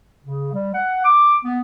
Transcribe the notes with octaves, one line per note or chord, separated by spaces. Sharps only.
C#3
G3
F#5
D6
B3